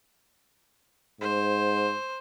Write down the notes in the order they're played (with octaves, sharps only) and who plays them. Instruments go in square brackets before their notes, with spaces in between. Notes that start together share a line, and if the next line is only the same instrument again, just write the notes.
[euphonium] G#2 [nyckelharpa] C5